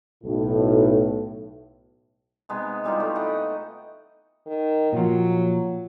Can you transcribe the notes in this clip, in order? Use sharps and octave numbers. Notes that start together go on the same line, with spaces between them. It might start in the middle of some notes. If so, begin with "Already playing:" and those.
B1 A2
C3 G#3 B3 D#4
E3 G3 D#4 F4
A3
B4 D#5 F#5 G5
D#3
A#2 F3 F#3